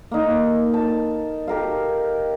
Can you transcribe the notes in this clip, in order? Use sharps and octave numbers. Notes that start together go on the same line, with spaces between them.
A#3 D#4
A5
G4 A#4 F5